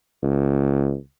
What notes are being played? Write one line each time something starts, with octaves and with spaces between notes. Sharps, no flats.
C#2